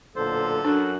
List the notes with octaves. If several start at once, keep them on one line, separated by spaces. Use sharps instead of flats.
B1 A#2 D3 A4 C5
F#2 D4 F#4